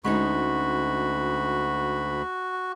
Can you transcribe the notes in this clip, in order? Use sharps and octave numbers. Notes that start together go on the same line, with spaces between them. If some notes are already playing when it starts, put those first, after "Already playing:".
D2 G#3 C#4 D#4 F#4 B5